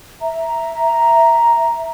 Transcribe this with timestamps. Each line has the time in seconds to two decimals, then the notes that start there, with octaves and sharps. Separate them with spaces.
0.21 E5 A#5